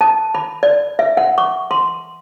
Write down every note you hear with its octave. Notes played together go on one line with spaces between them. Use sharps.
A5
B5
D5
E5
F#5
C#6
C6